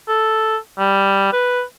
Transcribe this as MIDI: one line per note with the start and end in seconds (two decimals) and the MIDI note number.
0.08 0.57 69
0.78 1.31 55
1.33 1.62 71